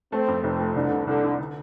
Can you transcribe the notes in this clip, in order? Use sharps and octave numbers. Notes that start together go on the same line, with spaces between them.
A3 C4
F2
F1 C4
A3
C2 D3
C2
C2 D3
C2
D3